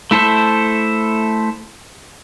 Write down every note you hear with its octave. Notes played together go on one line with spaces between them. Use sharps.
A3 E4 A4 C5 E5